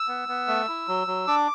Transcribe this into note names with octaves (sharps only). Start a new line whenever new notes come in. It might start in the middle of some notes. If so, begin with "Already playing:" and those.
Already playing: E6
B3
B3
A3
E4
F#3
F#3
D4 D6